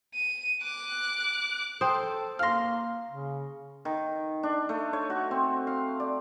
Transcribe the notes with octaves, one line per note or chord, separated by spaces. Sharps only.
D#7
D6 F#6
A4 C5 G5 D#6
A#3 F5 C6 F6 A#6
C#3
D#3
D4
A3
C#5
F#4
C4
F5
D5